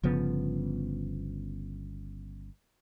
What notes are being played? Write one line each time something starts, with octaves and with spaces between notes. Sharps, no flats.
G1 C#3 F3 B3